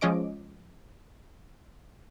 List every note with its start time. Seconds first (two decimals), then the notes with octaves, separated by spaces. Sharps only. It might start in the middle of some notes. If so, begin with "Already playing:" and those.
0.01 F3 G#3 C#4 D#5 D6 D7